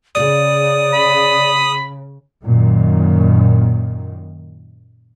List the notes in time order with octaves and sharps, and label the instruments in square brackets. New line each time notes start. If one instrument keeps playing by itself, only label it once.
[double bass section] C#3 [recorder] D5 [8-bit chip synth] D#6
[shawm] B5
[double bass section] F#2 A#2 D#3